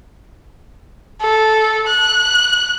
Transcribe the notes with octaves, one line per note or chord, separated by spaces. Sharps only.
A4
F#6